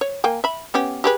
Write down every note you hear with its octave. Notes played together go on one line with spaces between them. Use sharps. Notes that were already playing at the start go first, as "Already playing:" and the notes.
C#5
A#3 G5 G#5
E5 B5
B3 C#4 G4
G4 G#4 B4